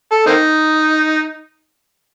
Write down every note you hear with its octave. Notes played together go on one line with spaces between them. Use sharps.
A4
A#3 C4 D#4